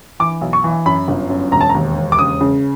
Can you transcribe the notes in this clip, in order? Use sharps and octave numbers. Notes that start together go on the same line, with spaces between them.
E3 D6
B1
C#6
E3
F#2 B5
G1
F#2
E1 A#5
A5
A#5
D#2
E1
D6
C#3 D#6
C#3